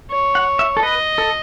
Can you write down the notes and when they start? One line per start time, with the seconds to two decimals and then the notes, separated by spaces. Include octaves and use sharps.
0.11 C#5
0.35 F#5
0.59 E5
0.77 A4
0.83 B4 D#5
1.18 A4